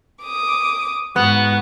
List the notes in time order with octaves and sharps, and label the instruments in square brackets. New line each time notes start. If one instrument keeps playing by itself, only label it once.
[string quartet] D6 D#6
[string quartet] G#2 F#4 [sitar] B3 [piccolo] F#6